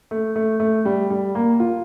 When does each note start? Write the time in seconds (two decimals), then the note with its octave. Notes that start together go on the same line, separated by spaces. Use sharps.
0.11 A3
0.36 A3
0.60 A3
0.85 G3
1.10 G3
1.35 A#3
1.60 F4